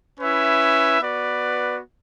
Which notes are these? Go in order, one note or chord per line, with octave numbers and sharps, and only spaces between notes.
C#4 E4 B4 E5
B3 F#4 B4 D5